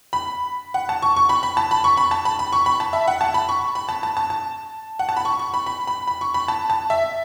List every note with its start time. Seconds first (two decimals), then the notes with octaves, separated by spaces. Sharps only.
0.13 B5
0.74 F#5
0.89 A5
1.02 C#6
1.17 C#6
1.29 B5
1.43 B5
1.57 A5
1.71 B5
1.84 C#6
1.97 B5
2.11 A5
2.25 B5
2.39 B5
2.53 C#6
2.66 B5
2.80 A5
2.93 E5
3.08 F#5
3.21 A5
3.34 B5
3.49 C#6
3.75 B5
3.89 A5
4.03 A5
4.17 A5
4.30 A5
4.99 F#5
5.09 A5
5.17 B5
5.25 C#6
5.39 C#6
5.54 B5
5.66 B5
5.87 B5
6.08 B5
6.21 C#6
6.34 B5
6.48 A5
6.70 A5
6.90 E5